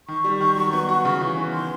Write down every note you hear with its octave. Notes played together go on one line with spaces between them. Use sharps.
D#3 C#6
G3
D#3
F#3
B3
F#4
C#3
E3
B3
D#3 C6